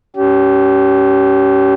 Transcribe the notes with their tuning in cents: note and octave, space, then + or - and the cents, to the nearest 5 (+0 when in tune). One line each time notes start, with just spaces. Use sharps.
C#4 +25 G4 -30